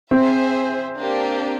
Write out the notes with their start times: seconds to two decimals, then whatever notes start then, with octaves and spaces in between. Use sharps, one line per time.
0.11 C4 G#4 C5 E5
0.97 A#3 D4 G4